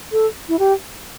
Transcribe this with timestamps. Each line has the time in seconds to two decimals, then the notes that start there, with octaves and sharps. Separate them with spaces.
0.12 A4
0.49 E4
0.59 G4